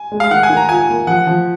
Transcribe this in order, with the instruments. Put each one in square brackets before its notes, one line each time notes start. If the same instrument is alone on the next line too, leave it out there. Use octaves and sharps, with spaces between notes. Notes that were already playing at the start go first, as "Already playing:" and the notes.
Already playing: [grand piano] G#5
[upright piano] G#3
[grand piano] F5
[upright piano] D#3 [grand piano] F#5
[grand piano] G#5
[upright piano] D#3
[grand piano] A#5
[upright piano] F4 [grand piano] G#5
[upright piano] A#3
[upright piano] F3 [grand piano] F#5
[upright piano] F3